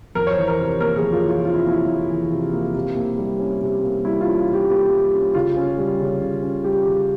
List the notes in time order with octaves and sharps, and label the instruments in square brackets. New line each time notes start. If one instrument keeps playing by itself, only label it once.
[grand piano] F2 A#4
C#5
C5
E3
A#4
C3
A#4
A#3 A#4
G#4
F2
F4
E3
F4
C3 F4
E4
A#3 E4
F2
E3
C3
A#3
C3
A#3
G3
C#4
C3
A#3
G3 E4
F4
C#4
C3
G4
A#3 G4
G3
C#4
C#3 F4
C#4
G3
C#3
C#3
C#4
G3 G4
C#3